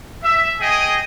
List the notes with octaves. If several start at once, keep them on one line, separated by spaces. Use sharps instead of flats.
E5
G#4 D#5 G5 G#5